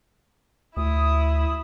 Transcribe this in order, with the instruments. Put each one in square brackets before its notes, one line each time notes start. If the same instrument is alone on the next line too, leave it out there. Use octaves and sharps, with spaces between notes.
[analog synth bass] D2 [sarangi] E4 [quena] D#6